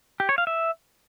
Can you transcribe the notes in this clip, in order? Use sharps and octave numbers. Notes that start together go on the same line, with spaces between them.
G4
C#5
F5
E5